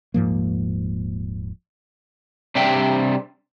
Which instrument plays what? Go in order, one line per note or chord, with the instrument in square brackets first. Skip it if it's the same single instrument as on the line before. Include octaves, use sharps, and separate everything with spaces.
[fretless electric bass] D#1 G#2 F3 A#3
[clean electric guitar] C3 G3 D4 E5 G5